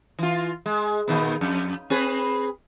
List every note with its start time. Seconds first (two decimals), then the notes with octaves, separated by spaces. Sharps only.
0.19 E3 F4
0.66 G#3
1.08 A#2 D#3 B3
1.41 F2
1.90 C4 G#4 B4